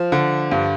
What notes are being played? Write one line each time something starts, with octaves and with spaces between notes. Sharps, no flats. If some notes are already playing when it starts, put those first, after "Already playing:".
Already playing: F3
D3
G2